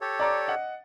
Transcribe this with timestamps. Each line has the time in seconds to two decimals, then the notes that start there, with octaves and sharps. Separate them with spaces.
0.01 G4 A4 C#5
0.19 D5 A#5 D6
0.48 D#5 F#5